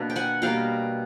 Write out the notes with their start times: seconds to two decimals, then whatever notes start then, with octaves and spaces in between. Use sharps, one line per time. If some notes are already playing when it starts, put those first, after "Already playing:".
Already playing: B2 A#3 D4
0.10 G5
0.16 F#5 G#5
0.42 B2 G3 A#3 F5 G5